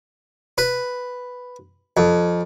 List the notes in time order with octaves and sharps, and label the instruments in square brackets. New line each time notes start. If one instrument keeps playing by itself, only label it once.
[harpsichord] B4
F2